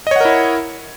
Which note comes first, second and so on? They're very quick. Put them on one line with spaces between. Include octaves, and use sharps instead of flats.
D#5 C#5 F#5 A#4 E4